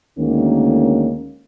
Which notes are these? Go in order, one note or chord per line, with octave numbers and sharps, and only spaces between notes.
D2 D#3 G#3 A#3 C#4